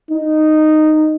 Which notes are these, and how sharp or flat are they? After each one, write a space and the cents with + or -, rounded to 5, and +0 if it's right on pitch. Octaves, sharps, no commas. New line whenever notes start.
D#4 -10